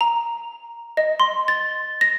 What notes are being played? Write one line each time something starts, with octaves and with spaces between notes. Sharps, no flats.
A#5
D#5
C6
A6
A#6